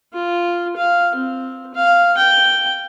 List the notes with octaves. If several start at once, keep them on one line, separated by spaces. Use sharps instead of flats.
F4
F5
C4
F5
G5